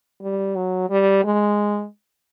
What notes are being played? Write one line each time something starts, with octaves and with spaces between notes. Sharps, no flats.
G3
F#3
G3
G#3